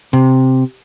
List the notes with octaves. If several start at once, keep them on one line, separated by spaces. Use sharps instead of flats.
C3